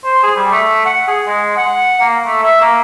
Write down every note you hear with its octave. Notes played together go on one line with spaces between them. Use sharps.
C5
G#4
G3
A3
F#5
G#4
G#3
F#5
A#3
A3
E5
A#3